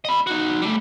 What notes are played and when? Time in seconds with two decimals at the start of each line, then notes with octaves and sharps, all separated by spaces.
0.05 D#5 B5
0.27 D#4 F#4
0.62 G3 A3